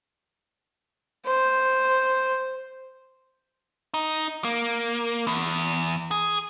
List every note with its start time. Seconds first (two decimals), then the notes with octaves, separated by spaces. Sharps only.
1.27 C5
3.94 D#4
4.44 A#3
5.27 E2
6.11 G#4